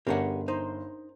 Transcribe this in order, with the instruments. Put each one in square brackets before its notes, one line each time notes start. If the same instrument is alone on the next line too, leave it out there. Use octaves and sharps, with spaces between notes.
[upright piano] G1 [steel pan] C#4 D4 A#4 [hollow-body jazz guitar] G4 G#4 F#5
[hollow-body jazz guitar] D#4 [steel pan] C5